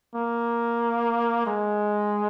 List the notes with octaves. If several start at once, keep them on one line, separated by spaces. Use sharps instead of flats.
A#3
G#3